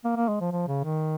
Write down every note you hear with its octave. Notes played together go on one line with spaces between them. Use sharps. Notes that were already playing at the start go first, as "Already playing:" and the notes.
A#3
A#3
G#3
F3
F3
C#3
D#3